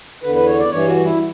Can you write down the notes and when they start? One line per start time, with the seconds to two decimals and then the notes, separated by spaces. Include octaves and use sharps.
0.23 D3 B4
0.26 E2
0.35 B4
0.47 C#5
0.59 D5
0.71 G2 E3 C#5
0.88 F#4
1.04 E4